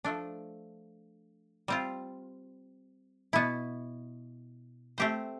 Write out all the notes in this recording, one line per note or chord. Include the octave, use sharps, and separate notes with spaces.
F3 A3 D4
G3 C4 F4
B2 B3 E4
A3 C4 G4 C5